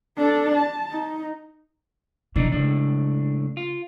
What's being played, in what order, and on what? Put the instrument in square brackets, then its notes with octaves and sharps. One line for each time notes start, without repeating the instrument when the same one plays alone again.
[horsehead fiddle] D4 A4
A5
D#4
[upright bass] B2 F3 [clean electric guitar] E3 D4 D#4
[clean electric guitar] C#2 A2 D4 [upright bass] C#3
[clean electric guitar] F4